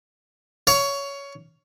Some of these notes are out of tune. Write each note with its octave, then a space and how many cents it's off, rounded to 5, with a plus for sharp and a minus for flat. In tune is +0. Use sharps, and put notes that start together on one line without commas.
C#5 +15 F5 -5